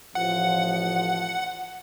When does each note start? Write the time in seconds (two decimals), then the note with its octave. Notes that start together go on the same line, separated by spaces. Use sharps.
0.15 A1 F3 F#5